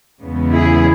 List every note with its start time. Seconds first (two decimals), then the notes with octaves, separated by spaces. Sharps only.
0.21 E2 C#3 G#3 B3
0.51 E4 G#4